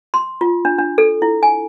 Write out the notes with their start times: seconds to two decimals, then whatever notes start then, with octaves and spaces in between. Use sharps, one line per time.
0.14 C6
0.41 F4
0.65 D4
0.79 D4
0.98 A4
1.22 E4
1.43 G#5